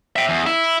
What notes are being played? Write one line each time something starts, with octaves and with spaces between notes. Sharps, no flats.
E5 G5
E2
E4